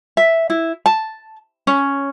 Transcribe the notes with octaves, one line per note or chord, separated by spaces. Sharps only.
E5
E4
A5
C#4